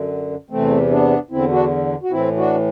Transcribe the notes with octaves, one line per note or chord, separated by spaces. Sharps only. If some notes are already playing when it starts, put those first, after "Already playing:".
Already playing: F#2 D3
E2 C3 E3 A3 C4
B3 D4
E2 D3 C4 E4
D4 F#4
F#4
A2 E3 C4 E4
D4 F#4